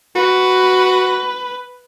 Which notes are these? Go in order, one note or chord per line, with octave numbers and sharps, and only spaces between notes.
F#4 B4